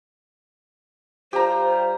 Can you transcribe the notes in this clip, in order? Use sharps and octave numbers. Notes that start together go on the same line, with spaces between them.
G3 F4 G4 C5 A#5